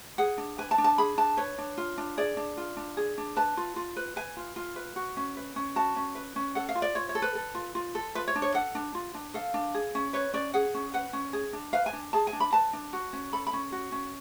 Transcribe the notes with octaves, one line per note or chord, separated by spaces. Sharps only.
G#4 F#5
D4
B4 G#5
A5
D4
A5
G#4 B5
D4 A5
B4 C#5
D4
F4
D4
G#4 D5
D4
F4
D4
G#4
D4
B4 A5
F4
F4
B4
B4 G#5
F4
F4
B4
F#4
C#4
B4
C#4
F#4 A5
C#4
B4
C#4
A4 F#5
F5
F4
D5
F4 C#5
C#5
A4
B4
A4
F4
F4
A4
F4 B4
C#5
D4
C#5
A4 F#5
D4
F4
D4
A4 F5
D4
G#4
C#4
B4 C#5
C#4 D5
G#4 F#5
C#4
B4 F#5
C#4
G#4
D4
B4 F5
G#5
D4
G#4 A5
G#5
D4
B5
B4 A5
D4
F#4
C#4
A4 B5
B5
C#4
F#4
C#4